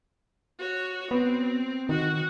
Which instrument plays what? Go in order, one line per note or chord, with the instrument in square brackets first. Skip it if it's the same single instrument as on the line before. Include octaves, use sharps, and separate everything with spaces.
[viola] F#4 C#5
[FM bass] B3 [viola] C4
[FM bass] D#3 [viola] F#4 F#5